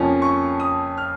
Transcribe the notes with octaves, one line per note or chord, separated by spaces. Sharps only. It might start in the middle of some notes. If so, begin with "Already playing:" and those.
Already playing: F2 C#3 F3 A#3 C#4
C#6
D#6
F6